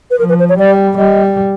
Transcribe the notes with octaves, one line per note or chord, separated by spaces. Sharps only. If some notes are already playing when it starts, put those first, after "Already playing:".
B4
F3 A#4
B4
C5
C#5
G3 D5
G3 D#5